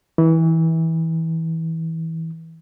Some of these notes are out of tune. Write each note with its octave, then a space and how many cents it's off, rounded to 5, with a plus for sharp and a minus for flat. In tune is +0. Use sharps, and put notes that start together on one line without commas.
E3 -25